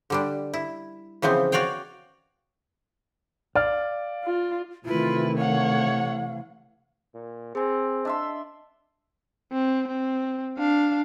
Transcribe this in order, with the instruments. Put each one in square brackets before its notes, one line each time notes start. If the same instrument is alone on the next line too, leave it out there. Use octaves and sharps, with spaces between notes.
[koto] D3 G3 D4
E4
C#3 E3 F3 B3 C4
F#4 C#5 D5 F5 G5
[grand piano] D5 [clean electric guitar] F5
[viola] F4
[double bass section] C3 E3 A3 [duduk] D#3 [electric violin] E4 B4 [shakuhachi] F4
[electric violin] C#5 F#5 [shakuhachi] F5
[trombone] A#2
[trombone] C4 [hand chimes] G#4 G#5
[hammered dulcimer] D4 E5 C6 [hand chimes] D#5
[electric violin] C4
C4
D4 F5